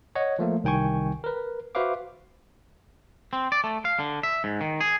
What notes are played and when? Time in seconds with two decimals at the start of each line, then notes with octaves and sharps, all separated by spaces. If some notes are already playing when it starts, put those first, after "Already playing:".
0.15 C#5 D#5 F#5
0.39 F3 A3 A#3
0.64 C2 D#3 G5 G#5 C#6
1.24 A#4 B4
1.75 F#4 B4 C5 E5 F5 D6
3.33 C4
3.52 D5
3.64 A3
3.85 F5
3.99 D3
4.23 E5
4.44 G#2
4.61 D#3
4.81 G#4